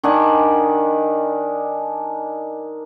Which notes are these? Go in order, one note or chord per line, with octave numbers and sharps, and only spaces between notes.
D#3 D4 F#5 G#5